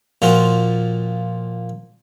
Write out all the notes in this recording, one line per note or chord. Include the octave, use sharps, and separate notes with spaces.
A#2 F3 F4 F#4